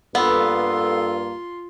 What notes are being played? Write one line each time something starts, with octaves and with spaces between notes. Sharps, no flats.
G2 A#3 B3 F4 A4 C6 E6